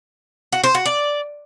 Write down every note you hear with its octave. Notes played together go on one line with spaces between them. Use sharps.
F#4
C5
F#4
D5